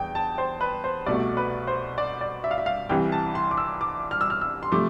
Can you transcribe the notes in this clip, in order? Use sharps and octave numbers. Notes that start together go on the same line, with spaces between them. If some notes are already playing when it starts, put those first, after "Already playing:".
Already playing: E2 G5
A5
C5
B4
C5
C2 B2 A3 D5
B4
C5
D5
D5
E5
F5
E5
F5
C2 C3 E3 G5
A5
C6
D6
E6
D6
F6
E6
F6
E6
C6
C3 F3 A3 D6